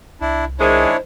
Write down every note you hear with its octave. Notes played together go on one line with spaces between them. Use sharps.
C2 D4 E4
D#3 G#3 D4 E4 C5 C#5